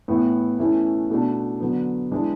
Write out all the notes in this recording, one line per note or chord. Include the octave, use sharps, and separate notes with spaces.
A2 E3 B3 E4
E3 A3 C#4 E4
B2 A3 D4
D3 F#3 B3
E3 G#3 D4